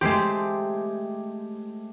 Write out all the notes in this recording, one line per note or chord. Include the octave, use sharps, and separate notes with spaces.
G#3 A3 C4 G4